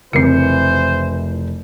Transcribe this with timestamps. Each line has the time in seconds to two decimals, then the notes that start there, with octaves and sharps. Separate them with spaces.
0.13 F1 C#3 E3 C4 A#4 C5 C#7